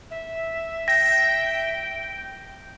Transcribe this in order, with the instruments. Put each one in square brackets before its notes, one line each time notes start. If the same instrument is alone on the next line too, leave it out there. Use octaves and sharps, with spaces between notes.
[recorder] E5
[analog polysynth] G5 [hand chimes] A#6